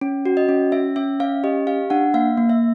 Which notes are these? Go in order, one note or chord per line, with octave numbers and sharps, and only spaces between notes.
C#4
F#4
D#5
C#4
C#4 E5
C#4 E5
C#4 F5
G4 D#5
G4 F5
D4 F#5
A#3 F5
A#3
E5